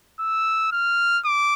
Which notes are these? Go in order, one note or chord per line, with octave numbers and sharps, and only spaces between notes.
E6
F6
D6